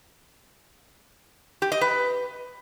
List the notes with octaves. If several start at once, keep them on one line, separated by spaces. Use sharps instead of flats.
G4
D#5
B4